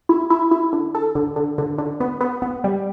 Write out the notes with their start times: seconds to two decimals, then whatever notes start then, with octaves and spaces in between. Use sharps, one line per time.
0.09 E4
0.30 E4
0.51 E4
0.73 D3
0.95 A4
1.15 D3
1.36 D3
1.58 D3
1.78 D3
2.00 B3
2.21 B3
2.42 B3
2.64 G3